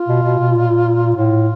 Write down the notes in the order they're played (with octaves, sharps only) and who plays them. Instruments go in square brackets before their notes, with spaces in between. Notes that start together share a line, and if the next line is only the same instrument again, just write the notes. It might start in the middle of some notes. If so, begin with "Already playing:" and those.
Already playing: [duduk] F4
[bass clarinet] B2
B2
B2
A#2
[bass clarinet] A2 [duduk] F4